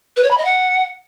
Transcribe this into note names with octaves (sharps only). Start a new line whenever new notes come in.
B4
C#5
B5
D#5
F#5